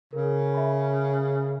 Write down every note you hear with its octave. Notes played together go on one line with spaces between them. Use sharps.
C#3 A#4
E5 B5